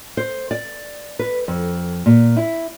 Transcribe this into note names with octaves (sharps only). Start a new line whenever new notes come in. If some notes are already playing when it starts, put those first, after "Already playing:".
C5
D5
B4
F2
A#2
E4